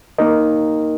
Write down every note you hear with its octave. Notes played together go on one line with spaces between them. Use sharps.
A#3 D#4 A#4 D#5